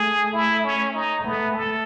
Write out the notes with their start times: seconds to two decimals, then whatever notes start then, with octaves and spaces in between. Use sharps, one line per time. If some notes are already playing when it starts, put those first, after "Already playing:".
Already playing: A3 G#4
0.34 E4
0.64 C#4
0.94 D#4
1.24 A3 B3
1.55 A4